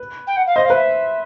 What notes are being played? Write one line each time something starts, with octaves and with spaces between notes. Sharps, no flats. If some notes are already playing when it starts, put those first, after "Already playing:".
Already playing: B4
G5
F#5
F5
C5 D#5
F5
B4 E5